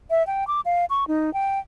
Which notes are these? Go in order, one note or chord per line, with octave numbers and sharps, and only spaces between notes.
E5
G5
D6
F5
C#6
D#4
G5